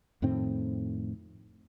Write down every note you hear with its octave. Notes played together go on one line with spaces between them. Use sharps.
F2 A2 D#3 C4